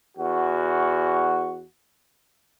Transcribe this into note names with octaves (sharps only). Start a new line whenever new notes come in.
E2 F#4